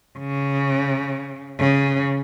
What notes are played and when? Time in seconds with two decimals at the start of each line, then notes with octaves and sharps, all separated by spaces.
0.19 C#3
1.59 C#3